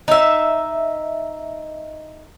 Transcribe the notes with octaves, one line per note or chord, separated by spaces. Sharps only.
D#4 E5